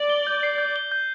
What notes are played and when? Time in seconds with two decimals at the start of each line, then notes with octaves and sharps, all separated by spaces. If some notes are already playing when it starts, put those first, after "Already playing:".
Already playing: D5
0.10 G7
0.27 G6
0.43 C7
0.58 G6
0.76 G7
0.92 G6